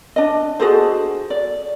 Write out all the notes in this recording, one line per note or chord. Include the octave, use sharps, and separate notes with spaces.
D4 D#5
F#4 G#4 A4 C5
D5